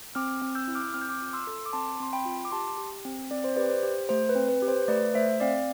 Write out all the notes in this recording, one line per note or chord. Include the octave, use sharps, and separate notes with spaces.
C4 D6 F6
C4
E6 G6
E4
D6 F6
C4 F6
G6
D6 F6
F4
C6 E6
A4
D6
C4 A5 C6
C4 C6
G5 B5
F4
D6
G4 A5 C6
G4
C4
C4 D5
C5
G4 B4 D5
C5
G4
A3 C5
B4
C4
B4
G4
C5
A3 B4 D5
A3 C5 E5
C4 D5 F5